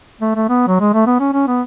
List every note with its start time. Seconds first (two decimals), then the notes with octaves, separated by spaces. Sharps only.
0.21 A3
0.36 A3
0.49 B3
0.68 F#3
0.81 G#3
0.94 A3
1.06 B3
1.20 C#4
1.33 C#4
1.47 B3